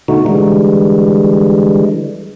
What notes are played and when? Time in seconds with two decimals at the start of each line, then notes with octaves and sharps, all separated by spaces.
0.08 B2 D3 A3 D#4 F#4
0.26 D3 E3 G3 G#3